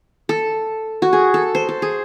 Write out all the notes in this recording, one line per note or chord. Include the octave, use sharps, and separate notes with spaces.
A4
F#4
G#4
A4
C5
A4
G#4